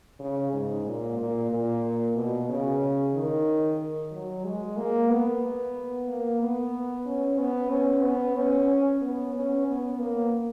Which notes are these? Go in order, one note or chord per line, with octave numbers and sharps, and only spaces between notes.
C#3
G#2
A#2
A#2
A#2
B2
C#3
D#3
F#3
G#3
A#3
B3
A#3
B3
C#4
B3
C#4
B3
C#4
B3
C#4
B3
A#3